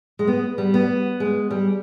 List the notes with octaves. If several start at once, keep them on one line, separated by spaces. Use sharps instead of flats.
G#3
B3
G3
B3
G#3
G3